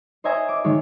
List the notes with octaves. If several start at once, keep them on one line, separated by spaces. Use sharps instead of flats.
C5 C#5 D#5 E5 G#5 A#5
D6
D#3 G#3 C#5